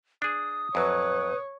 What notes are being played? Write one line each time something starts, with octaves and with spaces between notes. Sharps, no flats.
D4 G#4 D#6
F2 F#3 B4 C#5